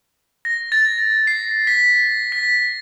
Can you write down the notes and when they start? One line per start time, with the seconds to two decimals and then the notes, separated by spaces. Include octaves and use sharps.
0.45 A#6
0.72 A6
1.27 C7
1.67 B6
2.32 B6